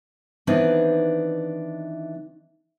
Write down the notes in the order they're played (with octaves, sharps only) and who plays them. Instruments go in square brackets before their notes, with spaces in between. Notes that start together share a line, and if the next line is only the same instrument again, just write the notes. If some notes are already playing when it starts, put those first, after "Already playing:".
[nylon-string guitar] D#3 E3 B3 C4 D4 D#4